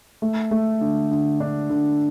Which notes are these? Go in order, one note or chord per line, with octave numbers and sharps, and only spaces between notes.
A3
A3
D3
D3
D4
D3